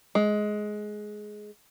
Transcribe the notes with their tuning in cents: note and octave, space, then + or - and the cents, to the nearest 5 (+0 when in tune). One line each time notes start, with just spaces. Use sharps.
G#3 +15